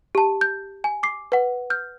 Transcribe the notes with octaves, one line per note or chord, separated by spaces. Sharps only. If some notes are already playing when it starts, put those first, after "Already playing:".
G4 A5
G6
G#5
D6 C7
B4 F#5
F6 G6